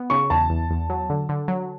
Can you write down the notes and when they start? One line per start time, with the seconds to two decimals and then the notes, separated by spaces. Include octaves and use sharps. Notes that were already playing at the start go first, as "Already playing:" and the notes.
Already playing: B3
0.10 C#3 C#6
0.30 E2 A5
0.50 E2
0.70 E2
0.90 F#3
1.10 D3
1.29 D3
1.48 F#3